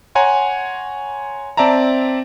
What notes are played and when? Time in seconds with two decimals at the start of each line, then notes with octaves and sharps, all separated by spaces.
0.15 C#5 F#5 G#5 A#5 C6
1.57 C4 D5 E5 A5 A#5